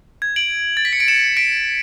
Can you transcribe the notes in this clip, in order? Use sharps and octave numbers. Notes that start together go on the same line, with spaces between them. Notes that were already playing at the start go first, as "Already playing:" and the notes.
G#6
D7 F#7
A6
B6
C#7
D7
C#7 E7
B6 D7